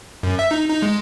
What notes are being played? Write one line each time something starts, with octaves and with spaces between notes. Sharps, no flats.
F#2
E5
D#4
D#4
G#3